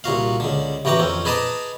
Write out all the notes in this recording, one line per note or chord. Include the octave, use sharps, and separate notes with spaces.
C2 A#2 F#4 F5
C#2 D3
A1 E3 F#4 G5 A#5 D6
F2 C4 C#4
G#4 B4 D#5 A5 A#5 D6